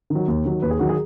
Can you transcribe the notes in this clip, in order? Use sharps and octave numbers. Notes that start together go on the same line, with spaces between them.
D#3
F#3
D#2
D#3 F#3
D#2 B4
G#4
D#3 F#3 F#4
G#4